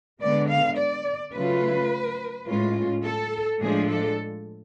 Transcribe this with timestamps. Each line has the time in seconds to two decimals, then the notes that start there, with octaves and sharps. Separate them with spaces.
0.21 D3 G#3 B3 D5
0.50 F5
0.78 D5
1.34 C#3 F#3 A3 F4 B4
2.47 A2 G#3 C#4 F4
3.04 A4
3.60 A2 F3 G#3 D4 G#4
3.89 A4